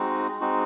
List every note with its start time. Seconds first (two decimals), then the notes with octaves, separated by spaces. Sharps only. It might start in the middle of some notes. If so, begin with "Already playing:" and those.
Already playing: G#3 C4 D#4 F#4
0.41 G#3 C4 D#4 F#4